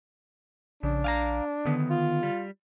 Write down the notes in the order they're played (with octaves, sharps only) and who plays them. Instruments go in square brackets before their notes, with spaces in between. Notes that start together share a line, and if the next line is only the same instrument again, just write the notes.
[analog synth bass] A#1 [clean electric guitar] C#3 [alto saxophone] D4
[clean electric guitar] F5 G#5 A#5
[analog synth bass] D3 [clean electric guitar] D#3 B3
[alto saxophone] F4
[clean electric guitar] G3